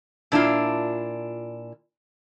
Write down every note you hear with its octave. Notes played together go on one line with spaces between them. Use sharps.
A#2 D4 E4 F4